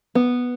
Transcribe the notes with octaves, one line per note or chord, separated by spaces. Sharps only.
B3